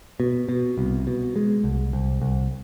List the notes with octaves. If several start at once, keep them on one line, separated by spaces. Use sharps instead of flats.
B2
B2
C2
B2
G#3
C2
C2
C2